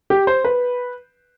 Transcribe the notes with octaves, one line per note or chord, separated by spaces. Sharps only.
G4
C5
B4